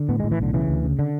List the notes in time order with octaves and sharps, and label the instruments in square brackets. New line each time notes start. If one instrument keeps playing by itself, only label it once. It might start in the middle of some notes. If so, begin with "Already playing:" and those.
Already playing: [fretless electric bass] D3
A2 B3
G#3
A2
E3
B1 D3
C#3 E3
D2
C#3
D3